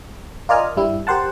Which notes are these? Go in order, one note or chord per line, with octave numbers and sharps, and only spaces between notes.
F4 A#4 D5 D#5 G#5 F6
G2 G3 E4
G4 A#4 C5 F#5 A5